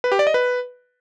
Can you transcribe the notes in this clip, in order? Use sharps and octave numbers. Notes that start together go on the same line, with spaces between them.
B4
G4
D5
D#5
B4